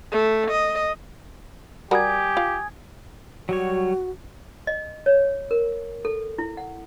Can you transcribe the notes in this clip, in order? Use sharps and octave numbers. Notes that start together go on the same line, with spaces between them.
A3
D#5
G3 F#4 G4 A#4 G#5 D#6 G#6
F4
F#3 G3 F#4 C#5
D#5
C#5
A#4
A4
E4
F#5